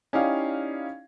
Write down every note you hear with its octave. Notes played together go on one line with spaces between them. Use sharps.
C#4 D#4 E4 G4 D5 F5